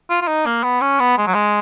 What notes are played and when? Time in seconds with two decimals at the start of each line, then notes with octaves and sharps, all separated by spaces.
0.10 F4
0.22 F4
0.28 D#4
0.46 A#3
0.63 B3
0.81 C#4
1.00 B3
1.18 G#3
1.27 F#3
1.35 G#3